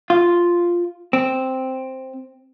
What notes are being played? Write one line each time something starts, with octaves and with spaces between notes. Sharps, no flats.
F4
C4